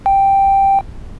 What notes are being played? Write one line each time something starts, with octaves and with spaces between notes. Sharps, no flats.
G5